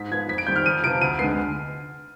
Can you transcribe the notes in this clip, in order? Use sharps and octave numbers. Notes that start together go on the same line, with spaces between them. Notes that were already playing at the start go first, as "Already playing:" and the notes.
Already playing: G#2 B6
F3 B3 G#6
F2 B6
D7
D#3 G3 C4 G6
F6
F2 D#7
C3 F3 B3 D7
D2 D#7
D3 G#3 B3 C7